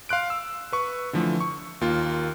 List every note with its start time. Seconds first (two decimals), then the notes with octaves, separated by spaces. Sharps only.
0.09 F5 C6 F#6 D7
0.30 E6
0.72 B4 C#6
1.13 D3 E3 F3 A3
1.40 C#6
1.81 D#2 A#3 F4